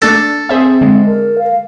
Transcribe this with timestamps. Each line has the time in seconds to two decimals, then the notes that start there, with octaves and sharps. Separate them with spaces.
0.02 A3 D4 A4 A6
0.49 C4 G#4 C5 E5
0.81 D3 G#3
1.06 A#4
1.39 F5